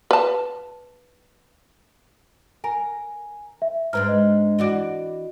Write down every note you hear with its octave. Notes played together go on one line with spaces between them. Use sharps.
B4 A5
A#4 G#5 A#5
E5
G#2 G#3 D4 B4 A#5 F6
D#5
E3 F#4 D5